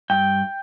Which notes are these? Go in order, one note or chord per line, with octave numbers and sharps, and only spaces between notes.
G2 G5